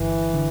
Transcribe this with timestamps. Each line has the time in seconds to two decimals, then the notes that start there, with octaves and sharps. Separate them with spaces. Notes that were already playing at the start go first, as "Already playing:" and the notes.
Already playing: G1 G2 D3 E3
0.34 D3